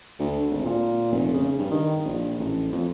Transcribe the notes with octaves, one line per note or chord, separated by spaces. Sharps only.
D2
G#1
A#2
F1
C#3
G2
D#3
A#1
A1
F2